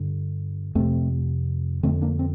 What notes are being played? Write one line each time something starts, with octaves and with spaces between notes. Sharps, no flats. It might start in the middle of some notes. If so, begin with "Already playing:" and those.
Already playing: G2 D3
F2 C3 A3 C4
F2 D3 A3 C4
A#3 D4
C4